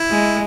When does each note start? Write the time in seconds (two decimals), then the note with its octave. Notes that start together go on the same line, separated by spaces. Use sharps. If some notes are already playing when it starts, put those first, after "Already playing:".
Already playing: E4
0.10 G#3